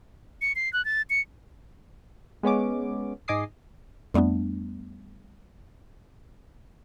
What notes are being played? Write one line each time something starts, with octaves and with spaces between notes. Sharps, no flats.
C#7
C7
F#6
A6
C#7
G#3 B3 C#4 D6
G#2 D#5 G#5 D6 D#6 C7
F2 G3 A3 B3 D4